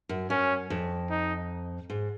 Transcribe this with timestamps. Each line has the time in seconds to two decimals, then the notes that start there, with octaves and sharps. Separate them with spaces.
0.09 F#2
0.30 F#2 C#4
0.70 F2
1.10 D#4
1.90 G#2